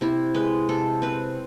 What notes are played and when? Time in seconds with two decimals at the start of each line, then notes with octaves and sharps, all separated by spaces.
0.01 C3 E4
0.34 G#3 B4
0.69 C3 A4
1.02 C4 B4